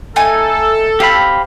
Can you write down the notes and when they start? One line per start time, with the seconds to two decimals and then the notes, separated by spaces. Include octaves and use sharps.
0.16 A3 D#4 A4 G#5
1.00 C4 G4 F5 B5